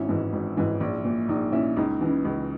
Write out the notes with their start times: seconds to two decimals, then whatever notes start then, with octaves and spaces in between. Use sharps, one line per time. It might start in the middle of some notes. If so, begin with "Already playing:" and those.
Already playing: G#1 C#4 E4
0.09 G#2 E3
0.33 G#1
0.57 G#2 E3
0.80 A#1
1.05 A#2
1.29 A#1 D#4
1.52 A#2 C#4 E4
1.77 C#2 D#4
2.01 C#3 E3
2.25 C#2